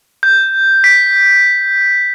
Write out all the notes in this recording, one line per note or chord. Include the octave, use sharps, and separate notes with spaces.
G6
B6